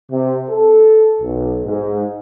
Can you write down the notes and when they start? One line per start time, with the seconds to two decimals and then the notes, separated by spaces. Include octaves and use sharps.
0.11 C3
0.50 A4
1.21 B1
1.65 G#2